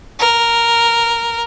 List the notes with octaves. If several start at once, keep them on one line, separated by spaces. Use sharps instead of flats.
A#4